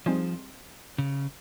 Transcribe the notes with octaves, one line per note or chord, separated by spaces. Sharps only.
F3 G3 C4 D#4 G#4 C5
C#3